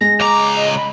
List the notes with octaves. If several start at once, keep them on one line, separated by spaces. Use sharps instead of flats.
G#3 A#6
C#2 A#5 D6
D#5
B5